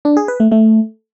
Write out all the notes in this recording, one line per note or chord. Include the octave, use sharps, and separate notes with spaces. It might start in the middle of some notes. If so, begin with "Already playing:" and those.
D4
G#4
B4
A3
A3